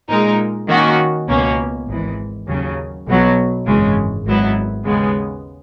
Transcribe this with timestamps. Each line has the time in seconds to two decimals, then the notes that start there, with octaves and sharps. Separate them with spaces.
0.09 A#2 G#3 D#4 A#4
0.68 D#3 A#3 C#4 F#4
1.28 C#2 B2 A#3 C#4
1.87 G#1 G#2 E3
2.47 D#2 C#3 F#3
3.06 B1 B2 F#3
3.65 G#1 F#2 C#3 E3 G#3
4.25 G#1 G#2 F#3 B3 E4
4.85 D#2 C#3 G#3 B3